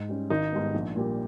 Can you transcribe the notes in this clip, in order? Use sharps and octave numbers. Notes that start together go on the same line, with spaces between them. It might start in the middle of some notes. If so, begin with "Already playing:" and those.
Already playing: G#2
G3 C#4
G#1 D#4
G#2 G3 B3
A#1
A#2 G3